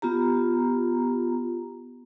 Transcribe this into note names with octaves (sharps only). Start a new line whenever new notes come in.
B3 F4 G4 A#5